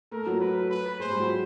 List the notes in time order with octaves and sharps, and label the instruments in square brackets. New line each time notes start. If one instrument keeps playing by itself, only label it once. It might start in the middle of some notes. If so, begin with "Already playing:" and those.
[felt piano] A3 [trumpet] A#4
[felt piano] F#3
[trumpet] B4
B4
[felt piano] G#3 [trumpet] C5
[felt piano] G3
F#3